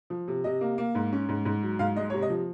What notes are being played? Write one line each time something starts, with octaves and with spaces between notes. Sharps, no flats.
F3
C3
C3 D#5
A#3
A#3
G#2
C#4
G#2
G#2
F#3
G#2 F5
G#3 D#5
C3 C#5
D#5
F3